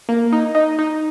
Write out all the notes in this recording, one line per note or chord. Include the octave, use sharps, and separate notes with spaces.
A#3
D#4
D#4
D#4